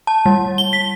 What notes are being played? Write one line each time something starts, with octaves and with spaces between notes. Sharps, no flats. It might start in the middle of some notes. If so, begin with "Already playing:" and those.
A5
G3
G7
B6